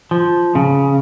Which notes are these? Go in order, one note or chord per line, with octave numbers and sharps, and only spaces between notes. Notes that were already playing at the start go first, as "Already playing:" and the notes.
F3
C#3